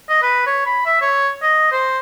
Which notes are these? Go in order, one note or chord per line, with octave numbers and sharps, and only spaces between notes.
D#5
B4
C#5
B5
E5
C#5
D#5
C5